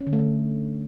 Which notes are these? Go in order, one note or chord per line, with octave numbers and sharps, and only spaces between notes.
C#4
D3
A3
D3